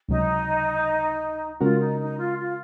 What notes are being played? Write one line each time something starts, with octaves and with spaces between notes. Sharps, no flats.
C#2 C3 F#3 D#4
C#3 G#3 C#4 F4 F#4 A#4
D#4
D#4
F4
F4